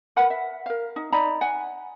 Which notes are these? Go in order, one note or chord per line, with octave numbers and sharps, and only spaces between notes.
A#4 B4 F#5 B5
E5
A#4 F5
D#4
D#4 D5 A#5 B5
F#5 G#5